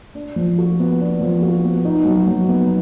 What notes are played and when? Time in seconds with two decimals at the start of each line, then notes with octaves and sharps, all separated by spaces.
0.15 D4
0.36 F3
0.58 F#4
0.79 B3
1.01 D4
1.21 F3
1.42 F#4
1.64 B3
1.85 D#4
2.05 F#3
2.27 F#3
2.48 B3